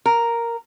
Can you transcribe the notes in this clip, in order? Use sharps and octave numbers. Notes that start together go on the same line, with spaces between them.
A#4